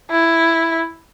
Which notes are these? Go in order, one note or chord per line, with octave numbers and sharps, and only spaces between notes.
E4